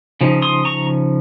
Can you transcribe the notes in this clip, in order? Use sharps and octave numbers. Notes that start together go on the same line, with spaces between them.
C#3 F3 D#4
C6 D#6
A#5 C#6